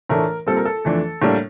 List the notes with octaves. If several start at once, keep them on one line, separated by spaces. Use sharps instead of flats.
A2 E3 A3 D4 A#4
A#2 G3 C4 A4
A#4
A4
F2 E3 A3 D4
A2 G3 A#3 D4